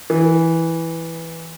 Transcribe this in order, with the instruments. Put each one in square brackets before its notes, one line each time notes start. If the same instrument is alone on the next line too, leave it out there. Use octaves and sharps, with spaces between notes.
[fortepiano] E3